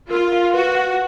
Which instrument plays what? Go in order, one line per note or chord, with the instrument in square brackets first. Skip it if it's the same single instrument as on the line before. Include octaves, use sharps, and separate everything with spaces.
[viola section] F4 [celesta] A#4
[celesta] F5
[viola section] F#4 [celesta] B4
[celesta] F#5